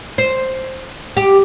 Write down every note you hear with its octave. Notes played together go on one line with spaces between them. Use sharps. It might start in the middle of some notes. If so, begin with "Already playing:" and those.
C5
G4